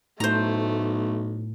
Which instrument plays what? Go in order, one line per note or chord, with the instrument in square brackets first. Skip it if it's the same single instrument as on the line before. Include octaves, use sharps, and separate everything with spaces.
[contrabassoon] B1 [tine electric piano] A2 [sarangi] A3 [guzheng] C5 A#5